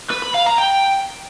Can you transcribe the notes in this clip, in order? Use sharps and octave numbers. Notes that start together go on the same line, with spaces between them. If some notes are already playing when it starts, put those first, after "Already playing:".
B4
B5
F5
A#5
G5